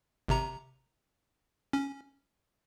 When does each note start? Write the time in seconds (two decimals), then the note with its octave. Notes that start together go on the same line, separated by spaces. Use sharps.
0.28 G#1 C3 A#5
1.73 C#4